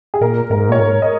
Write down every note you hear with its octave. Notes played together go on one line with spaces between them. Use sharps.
G#4
A#2 A#4
G#2 A#4
A#2 C#5
G#2 A#4
D#5